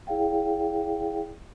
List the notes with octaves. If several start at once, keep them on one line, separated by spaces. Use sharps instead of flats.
E4 G#4 D5 F5 G5